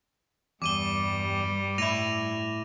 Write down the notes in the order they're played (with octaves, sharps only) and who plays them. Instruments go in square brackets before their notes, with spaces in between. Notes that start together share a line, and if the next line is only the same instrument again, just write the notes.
[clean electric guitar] E2 [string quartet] G2 G3 [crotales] D6 D#7 G7
[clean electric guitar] A2 E4 [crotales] A#6 D#7 F7